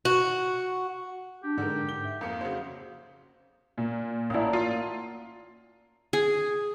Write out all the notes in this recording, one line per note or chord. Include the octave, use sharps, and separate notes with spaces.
F#4
D4 G4
G#2 D3 G#3 A#4
G7
E5
F2 A#3 F5 C#7
C#3 F#3 C5
A#2
A1 A#2 E4 F#5 A5
F4
G#4